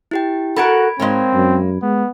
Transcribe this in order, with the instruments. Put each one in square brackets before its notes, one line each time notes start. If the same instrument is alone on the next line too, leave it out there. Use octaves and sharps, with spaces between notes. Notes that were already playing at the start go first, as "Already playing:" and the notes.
[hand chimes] E4 G4 G5
[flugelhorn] F#4 [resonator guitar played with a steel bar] A4 A#4 F#5 [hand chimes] B5 G#6 D7
[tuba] G#2 [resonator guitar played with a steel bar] G#3 A#3 C#5 [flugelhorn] C4
[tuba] F#2
[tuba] G#3 [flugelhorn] B3